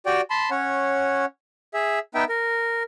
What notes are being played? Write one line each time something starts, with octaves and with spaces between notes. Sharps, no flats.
F#4 G4 D5 G5
A5 B5 C6
C#4 C#5 F#5
G#4 E5
B3 D#4 E5 G5
A#4